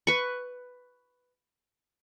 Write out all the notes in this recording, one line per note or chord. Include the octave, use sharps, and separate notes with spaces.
B4 C#6